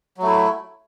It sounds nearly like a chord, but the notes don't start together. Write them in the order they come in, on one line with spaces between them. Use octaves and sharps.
F#3 A3 E4